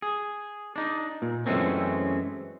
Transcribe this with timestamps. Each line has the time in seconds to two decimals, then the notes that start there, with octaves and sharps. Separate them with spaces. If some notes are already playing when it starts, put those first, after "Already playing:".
0.02 G#4
0.76 D4 D#4
1.22 A#2
1.46 F#2 E3 G#3 A3 C4 C#4